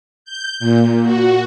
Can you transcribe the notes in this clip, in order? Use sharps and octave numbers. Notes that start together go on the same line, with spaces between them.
G6
A#2
F#4